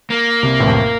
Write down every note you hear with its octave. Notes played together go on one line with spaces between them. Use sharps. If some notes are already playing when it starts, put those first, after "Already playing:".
A#3
C2 C3
A1 A2
F2